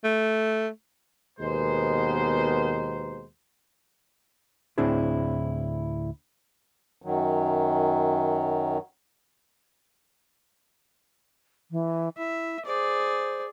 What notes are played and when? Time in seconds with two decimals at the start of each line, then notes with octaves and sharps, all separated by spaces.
0.04 A3
1.39 D#2 B2 G#3 B3 A#4 C5
4.78 D2 A2 C4 D4 E4 G#4
7.02 F#2 D#3 F#3
11.71 E3
12.17 E4 E5
12.66 G#4 C5 D5